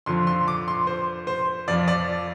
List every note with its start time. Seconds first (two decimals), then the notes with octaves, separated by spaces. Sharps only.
0.06 F2 D3 F3 C6
0.27 C6
0.48 D6
0.68 C6
0.87 C5
1.27 C5
1.68 F2 F3 D5
1.88 D5